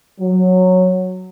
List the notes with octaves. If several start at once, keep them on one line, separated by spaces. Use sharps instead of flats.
F#3